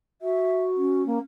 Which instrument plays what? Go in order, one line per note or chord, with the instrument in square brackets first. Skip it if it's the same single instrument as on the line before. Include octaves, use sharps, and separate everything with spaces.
[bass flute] F#4 [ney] E5
[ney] C#4
[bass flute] A#3